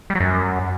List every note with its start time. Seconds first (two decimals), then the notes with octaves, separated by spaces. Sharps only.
0.10 G3
0.15 F#3
0.20 F#2